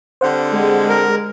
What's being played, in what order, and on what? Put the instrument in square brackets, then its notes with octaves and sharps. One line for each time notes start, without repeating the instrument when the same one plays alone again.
[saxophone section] D3 G3 C4 [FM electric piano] C5 F#5
[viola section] G#3
[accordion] A#4